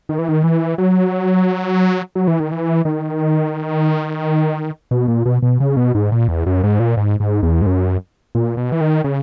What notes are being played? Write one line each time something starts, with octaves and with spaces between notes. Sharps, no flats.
D#3
E3
D#3
E3
F#3
F#3
E3
D#3
E3
D#3
B2
A#2
B2
B2
C#3
B2
G#2
A#2
E2
F#2
G#2
A#2
G#2
G#2
E2
G#2
F#2
A#2
B2
E3
D#3
C#3